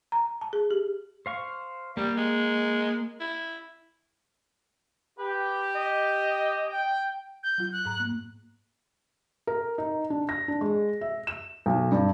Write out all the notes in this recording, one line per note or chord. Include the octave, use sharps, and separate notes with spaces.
A#5
A5
G#4
G4
C5 F5 C#6
G3 A#3
G#3
E4
G4 B4
D#5
G5
G6
F#3 F4
F#6
G#2 A#5
A#3
A#4
D#4
D4
A#6
D4
G#3
E5
E7
B1
G2